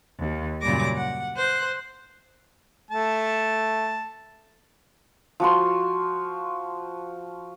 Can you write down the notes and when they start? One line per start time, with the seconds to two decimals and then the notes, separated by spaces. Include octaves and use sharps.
0.18 D#2
0.61 F#2 A#2 C#3 G3 D6 A#6
0.96 F#5
1.36 C5 F#6
2.91 A3 A5
5.40 F3 F#4 C6